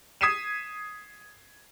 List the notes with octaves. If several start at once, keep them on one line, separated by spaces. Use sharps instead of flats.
D#6 G#6 B6 C7 D#7 E7